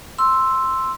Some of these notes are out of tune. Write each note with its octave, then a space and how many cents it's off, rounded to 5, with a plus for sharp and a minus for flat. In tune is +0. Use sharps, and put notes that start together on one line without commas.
C6 +0 E6 +0